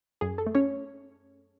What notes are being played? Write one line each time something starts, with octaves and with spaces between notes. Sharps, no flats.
F#2 G#4
A4
A3
C#4 C#5